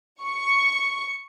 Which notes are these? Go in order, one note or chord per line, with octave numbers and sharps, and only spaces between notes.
C#6